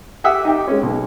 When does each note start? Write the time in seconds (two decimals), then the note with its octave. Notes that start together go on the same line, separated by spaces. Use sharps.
0.24 G4 E5 F#5 D#6 E6
0.45 D#4 G4
0.67 G#3 C#4
0.83 B1